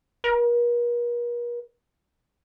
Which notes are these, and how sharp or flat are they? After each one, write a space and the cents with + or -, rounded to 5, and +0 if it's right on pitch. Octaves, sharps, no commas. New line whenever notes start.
A#4 +45